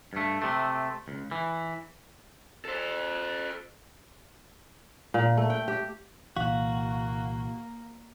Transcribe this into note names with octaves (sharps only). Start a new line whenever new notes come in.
G2 A3
C3 A3
C#2
E3
A4 C5
A#2
A3
G5
G4
C2 A#2 E3 A#3 F#4 F5